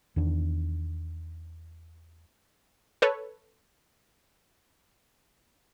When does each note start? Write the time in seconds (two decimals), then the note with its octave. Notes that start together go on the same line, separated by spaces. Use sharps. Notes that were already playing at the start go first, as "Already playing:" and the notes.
0.16 E2 D#3 D4
3.02 A4 B4 C#5